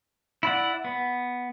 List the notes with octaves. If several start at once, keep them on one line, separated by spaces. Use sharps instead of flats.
E4 D5 F#5
B3